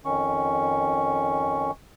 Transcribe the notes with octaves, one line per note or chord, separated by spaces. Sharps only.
F2 D#3 C#4 C#6